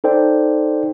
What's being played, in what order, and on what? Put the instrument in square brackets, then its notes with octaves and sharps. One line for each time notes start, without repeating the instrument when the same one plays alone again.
[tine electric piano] D#4 A4 C5 D5 G5